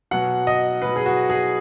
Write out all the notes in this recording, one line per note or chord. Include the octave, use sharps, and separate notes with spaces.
B2 F#3 F#5
D#5
B2 F#3 B4
G#4
F#4
G#4